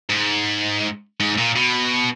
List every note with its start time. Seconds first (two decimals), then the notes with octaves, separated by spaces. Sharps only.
0.10 G#2
1.20 G#2
1.38 A#2
1.56 B2